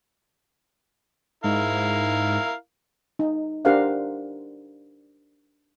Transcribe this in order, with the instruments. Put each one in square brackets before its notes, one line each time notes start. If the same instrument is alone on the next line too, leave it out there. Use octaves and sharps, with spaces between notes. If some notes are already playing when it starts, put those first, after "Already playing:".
[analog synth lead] G#2 [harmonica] E4 A#4 F5
[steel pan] D#4
D4 G4 A#4 C5 F5 F#5